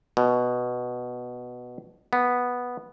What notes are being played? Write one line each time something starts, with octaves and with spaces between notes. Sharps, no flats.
B2
B3